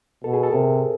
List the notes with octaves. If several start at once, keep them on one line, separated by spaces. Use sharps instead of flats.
B2 A4
G#4
A4
C3 A#4